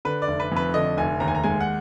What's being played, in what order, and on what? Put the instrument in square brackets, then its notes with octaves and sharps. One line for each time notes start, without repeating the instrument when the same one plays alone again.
[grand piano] D3 [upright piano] B4
[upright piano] D5
[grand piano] F1
[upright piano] B4
[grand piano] F2 [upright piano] B4
[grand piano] D3 [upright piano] D#5
[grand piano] F1 [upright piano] G#5
[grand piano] D#2 [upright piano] A#5
[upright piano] G#5
A#5
[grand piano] G#3 [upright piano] G#5
[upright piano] F#5